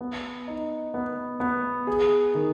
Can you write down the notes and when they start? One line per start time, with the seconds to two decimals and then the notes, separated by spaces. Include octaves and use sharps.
0.01 B3
0.48 D#4
0.94 B3
1.40 B3
1.87 G#4
2.35 D#3